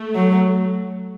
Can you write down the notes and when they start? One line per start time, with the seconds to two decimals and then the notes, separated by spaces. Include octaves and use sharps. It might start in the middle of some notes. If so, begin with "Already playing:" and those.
Already playing: A3
0.15 F#3